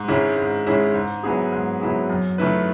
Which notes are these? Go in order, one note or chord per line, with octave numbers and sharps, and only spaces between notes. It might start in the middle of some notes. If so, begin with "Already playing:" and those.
Already playing: G#2
D#3 G#3 C#4 E4
G#2
D#3 G#3 C#4 E4
G#2
F#3 B3 E4 G#4
G#2
F#3 B3 E4 G#4
F#2
D#3 A3 E4 B4